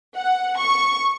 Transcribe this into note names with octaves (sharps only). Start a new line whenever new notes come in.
F#5
C#6